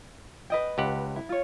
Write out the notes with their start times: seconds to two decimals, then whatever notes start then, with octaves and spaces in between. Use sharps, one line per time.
0.50 B4 D#5 G5
0.78 C#2 G4 F#5
1.16 E4
1.29 F4 C#5